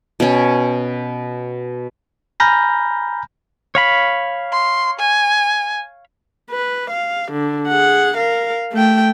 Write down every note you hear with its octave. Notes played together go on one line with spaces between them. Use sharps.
B2 C#4
G#5 A#5 B5 F6 G6 A#6
C#5 F5 B5
C6
G#5
B4
F5
D3
G#4 F#5
A#4 F5
A3 G5